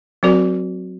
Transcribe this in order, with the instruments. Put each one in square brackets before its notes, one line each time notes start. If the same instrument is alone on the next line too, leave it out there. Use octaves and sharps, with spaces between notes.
[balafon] F#3 C4 F#4 A#4 D5